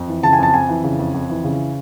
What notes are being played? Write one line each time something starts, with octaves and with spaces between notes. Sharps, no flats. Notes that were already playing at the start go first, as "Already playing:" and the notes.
Already playing: F2
E3
C#3 A5
G#5
F2 A5
F2 G#5
E3
C#3
F2
F2
E3
C#3